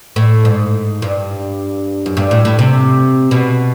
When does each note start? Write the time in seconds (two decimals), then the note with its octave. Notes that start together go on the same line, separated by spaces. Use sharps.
0.16 A2
0.45 G#2
1.02 G2
2.06 F#2
2.17 G2
2.31 A2
2.45 A2
2.59 C3
3.31 B2